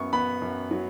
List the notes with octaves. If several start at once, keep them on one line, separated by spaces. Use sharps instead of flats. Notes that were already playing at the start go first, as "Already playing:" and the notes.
Already playing: F#2 B3 C#6
B3 B5
F#2
F#3